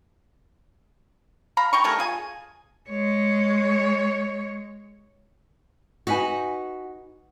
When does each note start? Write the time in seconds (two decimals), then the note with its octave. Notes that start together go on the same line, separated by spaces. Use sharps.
1.57 F5 A#5 B5
1.73 G5 A#5 C#6
1.84 G3 A3 G#4 A#4
1.99 F4 G#4 G#5
2.90 G#3 C#5
6.07 D#4 F#4 B4 G#5